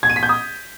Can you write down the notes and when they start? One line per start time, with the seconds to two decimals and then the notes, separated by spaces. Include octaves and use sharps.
0.03 G#6
0.10 D#7
0.16 B6
0.23 G6
0.29 D#6